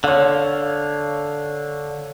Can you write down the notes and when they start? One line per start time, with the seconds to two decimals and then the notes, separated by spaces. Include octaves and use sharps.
0.04 D3 C#5 F5